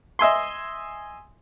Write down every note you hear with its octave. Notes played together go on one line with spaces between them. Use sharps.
D#5 E5 G#5 C6